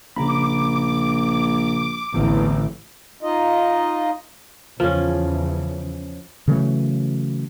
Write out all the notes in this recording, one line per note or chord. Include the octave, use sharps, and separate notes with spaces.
A#1 C#3 A#5 B5 D6
A1 E2 D3 E3 C4
D#4 F4 D#5
E2 C#3 E3 F3 C#4
C#3 E3 F#3 A3